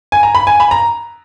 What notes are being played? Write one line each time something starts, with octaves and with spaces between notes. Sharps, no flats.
G#5
A#5
B5
G#5
B5
A#5